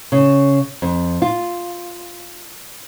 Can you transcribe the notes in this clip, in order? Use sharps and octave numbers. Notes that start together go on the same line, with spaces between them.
C#3
F2
F4